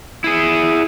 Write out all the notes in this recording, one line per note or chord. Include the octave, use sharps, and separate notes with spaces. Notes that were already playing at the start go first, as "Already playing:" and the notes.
E4 G#4